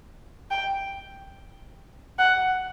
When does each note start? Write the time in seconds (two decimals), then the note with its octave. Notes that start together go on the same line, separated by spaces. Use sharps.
0.51 G5
2.19 F#5